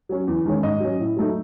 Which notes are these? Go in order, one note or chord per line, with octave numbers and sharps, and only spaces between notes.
F#3 C#4
E2
D#3 G#3 C#4
G#2 D#5
F#3 C#4
A2
F#3 A3 D#4